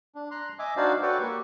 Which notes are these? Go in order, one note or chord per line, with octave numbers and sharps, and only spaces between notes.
D4
A#5 C6 F#6
D#5 E5 G#5 D6
D4 D#4 F#4 C5 D5 F5
F#4 A4 B4 C#5 D5 G5
A#3 G4 C#6